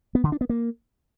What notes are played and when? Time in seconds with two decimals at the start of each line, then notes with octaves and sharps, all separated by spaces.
0.15 B3
0.24 D3
0.32 D4
0.41 B3
0.49 A#3